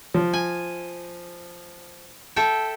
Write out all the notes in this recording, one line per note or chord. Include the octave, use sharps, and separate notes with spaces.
F3
G#5
A4 E5 G5